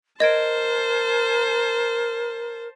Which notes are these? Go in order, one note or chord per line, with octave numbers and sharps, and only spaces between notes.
A#4 C5 D#5 A5 G#6 D7